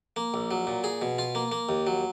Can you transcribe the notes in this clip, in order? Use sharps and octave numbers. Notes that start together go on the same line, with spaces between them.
A#3
A#1
F#3
A#2
G#4
B2
F4
A#3
A#3
D#2
F#3